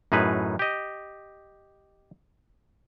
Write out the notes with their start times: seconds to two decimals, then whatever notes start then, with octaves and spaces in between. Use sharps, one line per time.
0.12 F#2 A2 D#4 G#4 B4
0.59 G4 D#5